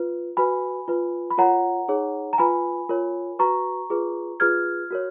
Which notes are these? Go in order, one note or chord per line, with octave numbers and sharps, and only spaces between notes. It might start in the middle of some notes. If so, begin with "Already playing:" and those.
Already playing: F4 B4
F#4 B4 G#5 B5
F4 B4
B5
F4 A#4 C#5 F#5 A#5
D#4 G#4 C#5
A#5
F4 B4 G#5 B5
F4 A#4 C#5
F#4 B4 A#5 C#6
F4 G#4 B4
F4 G#4 B4 F6 G#6
F#4 A#4 C#5